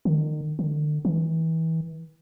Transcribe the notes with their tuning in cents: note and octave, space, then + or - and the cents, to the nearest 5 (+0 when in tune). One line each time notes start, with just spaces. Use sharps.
D#3 -35
D3 +40
E3 -30